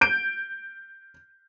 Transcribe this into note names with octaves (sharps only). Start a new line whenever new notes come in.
G6 D7